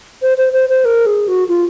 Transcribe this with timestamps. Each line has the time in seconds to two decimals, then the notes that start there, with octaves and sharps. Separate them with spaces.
0.22 C5
0.38 C5
0.53 C5
0.69 C5
0.85 A#4
1.06 G#4
1.28 F#4
1.49 F4